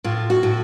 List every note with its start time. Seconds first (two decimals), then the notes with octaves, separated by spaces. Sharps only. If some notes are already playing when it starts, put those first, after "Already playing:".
0.04 A2 F4
0.30 F#4
0.43 A2